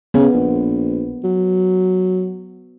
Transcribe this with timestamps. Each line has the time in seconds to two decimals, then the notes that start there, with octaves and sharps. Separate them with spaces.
0.14 C#3 B3
0.34 A#1
1.24 F#3